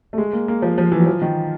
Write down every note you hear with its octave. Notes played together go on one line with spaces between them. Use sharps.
A3
G#3
A#3
A#3
F3
F3
E3
F#3
F3
D#3